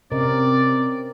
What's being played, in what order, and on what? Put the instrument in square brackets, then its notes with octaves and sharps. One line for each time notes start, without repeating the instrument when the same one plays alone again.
[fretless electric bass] C3 [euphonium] C4 [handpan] C#4 A#4 D#5 [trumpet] D5